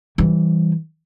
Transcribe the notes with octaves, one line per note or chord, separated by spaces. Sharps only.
E3 G3